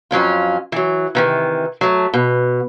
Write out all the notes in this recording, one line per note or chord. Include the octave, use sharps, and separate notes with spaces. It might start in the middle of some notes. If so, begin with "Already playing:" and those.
F2 F#3 C#4 F4
E3 F#3
C3 D#3 E3
F#3 A3
B2